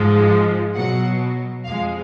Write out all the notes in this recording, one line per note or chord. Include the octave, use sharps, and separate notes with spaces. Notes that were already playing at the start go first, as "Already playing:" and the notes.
Already playing: G#2 F3 G#3
B2 F#3 F#5
F2 F3 G#3 F5